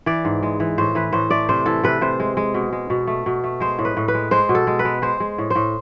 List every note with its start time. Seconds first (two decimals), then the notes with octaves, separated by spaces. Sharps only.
0.06 E3 D5
0.25 G#2
0.43 G#3
0.60 E3
0.78 A2 C5
0.95 E3 B4
1.13 A2 C5
1.30 A3 D5
1.49 C3 C5
1.66 E3 A4
1.84 C3 B4
2.01 C3 C5
2.20 G#3
2.37 G#3
2.54 B2
2.73 G#3
2.90 B2
3.07 A3
3.26 B2
3.44 A3
3.60 G#3 C5
3.79 A2
3.85 B4
3.97 A2
4.08 B4
4.14 G#3
4.31 G#3 C5
4.49 B2
4.55 A4
4.67 G#3
4.79 B4
4.85 G#3
5.02 G#3 C5
5.20 G#3
5.38 A2
5.50 C5
5.55 A2